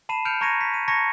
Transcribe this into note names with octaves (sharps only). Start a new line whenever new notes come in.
A5 B5 C7 D#7 E7
F6 G6 C#7 D7 F7
A#5 C#6 G#6 A#6 C#7 D#7
B6
D#7
A5 A#5 C#6 G#6 A#6 C#7